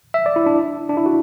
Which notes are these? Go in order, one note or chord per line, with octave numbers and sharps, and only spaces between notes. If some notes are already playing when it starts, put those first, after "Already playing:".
E5
D5
E4
D4
D4
E4
F#4